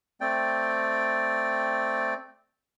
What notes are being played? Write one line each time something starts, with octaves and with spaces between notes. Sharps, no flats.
A3 C4 D5 G5